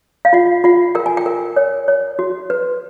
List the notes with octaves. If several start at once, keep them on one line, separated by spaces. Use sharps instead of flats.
F5
F4 F#5
F4 F#5
A#4 G5
G#5
G5
A#4
C#5
C#5
F#4
B4